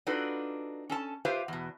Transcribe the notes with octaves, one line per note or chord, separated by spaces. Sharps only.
D4 D#4 F4 F#4 A4 B4
C#4 A4 A5
F4 G4 B4 C5 E5 F5
E2 B2